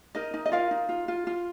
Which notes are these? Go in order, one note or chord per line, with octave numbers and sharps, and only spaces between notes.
D#4 A#4 D#5
D#4
D#5
F4 A#4 F5
D#4
F4
F4
F4